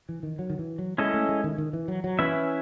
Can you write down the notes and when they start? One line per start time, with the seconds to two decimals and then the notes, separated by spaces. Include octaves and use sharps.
0.09 E3
0.23 D#3
0.39 F#3
0.50 D#3
0.59 E3
0.79 F#3
0.98 G#3 C#4 E4 A4 D#5
1.14 A3
1.29 G#3
1.44 D#3
1.58 D#3
1.73 E3
1.88 F#3
2.04 F#3
2.19 E3 C#4 E4 B4 E5